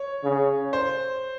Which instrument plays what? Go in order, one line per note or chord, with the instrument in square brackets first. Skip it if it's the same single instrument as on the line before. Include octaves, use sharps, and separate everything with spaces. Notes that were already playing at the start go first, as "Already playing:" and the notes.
Already playing: [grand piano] C#5
[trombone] C#3
[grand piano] C5